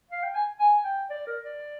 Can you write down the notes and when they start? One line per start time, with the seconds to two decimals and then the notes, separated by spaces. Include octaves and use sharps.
0.11 F5
0.23 G5
0.35 G#5
0.60 G#5
0.85 G5
1.10 D5
1.27 A#4
1.43 D5